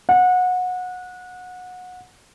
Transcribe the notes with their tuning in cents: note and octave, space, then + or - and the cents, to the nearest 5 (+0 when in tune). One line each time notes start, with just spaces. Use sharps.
F#5 -25